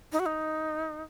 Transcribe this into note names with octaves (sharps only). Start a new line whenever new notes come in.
D#4
F#4
D#4